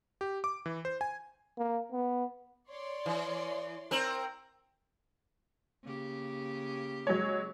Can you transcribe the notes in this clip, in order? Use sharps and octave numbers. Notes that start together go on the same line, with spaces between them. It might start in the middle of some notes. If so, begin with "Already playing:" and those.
G4
D6
E3
C5
G#5
A#3
B3
C#5 D5 C6
E3
C4 A#4
C#3 A#3 G4
F#3 G#3 C#5